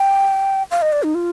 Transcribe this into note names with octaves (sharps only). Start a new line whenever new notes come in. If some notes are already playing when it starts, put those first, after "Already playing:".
Already playing: G5
F5
D#5
D5
D#4
F4